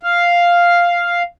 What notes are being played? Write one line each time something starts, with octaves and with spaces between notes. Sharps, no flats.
F5